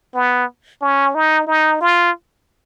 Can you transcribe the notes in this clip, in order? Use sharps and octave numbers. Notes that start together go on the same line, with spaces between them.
B3
C#4
D#4
D#4
F4